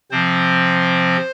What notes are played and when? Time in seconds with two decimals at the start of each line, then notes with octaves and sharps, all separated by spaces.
0.11 C3 F3 C4 C5